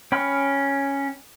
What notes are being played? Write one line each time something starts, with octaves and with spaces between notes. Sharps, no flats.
C#4 G5 B5 F6